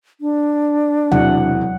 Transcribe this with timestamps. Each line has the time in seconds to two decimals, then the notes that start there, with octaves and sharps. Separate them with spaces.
0.21 D4
1.12 E1 C3 E3 F#3 F#5